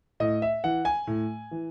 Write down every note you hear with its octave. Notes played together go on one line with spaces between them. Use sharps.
A2 D#5
E5
E3 F#5
G#5
A2
E3